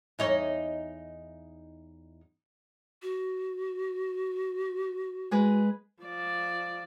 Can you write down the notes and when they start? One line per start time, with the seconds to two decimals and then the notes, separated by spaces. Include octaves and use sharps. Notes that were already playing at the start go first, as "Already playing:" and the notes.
0.19 E2 D#4 C#5
3.02 F#4
5.31 G#3 G#4 B4
6.03 F3 D5